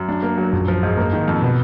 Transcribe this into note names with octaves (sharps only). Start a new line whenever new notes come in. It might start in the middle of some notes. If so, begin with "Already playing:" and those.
Already playing: F#2
D4
A#3
F#3
A#1 F#2
F3
G#2
A#3
D#3
F2
B2 B3